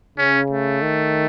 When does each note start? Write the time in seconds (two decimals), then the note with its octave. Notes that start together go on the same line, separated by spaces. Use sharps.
0.18 C#3 C#4
0.50 A3
0.82 D#3